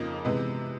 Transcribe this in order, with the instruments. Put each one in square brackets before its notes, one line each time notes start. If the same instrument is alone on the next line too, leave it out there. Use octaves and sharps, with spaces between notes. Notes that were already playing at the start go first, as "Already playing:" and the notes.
Already playing: [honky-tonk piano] F2 C#3 F3 A#3 D#4
C3 E3 G#3 B3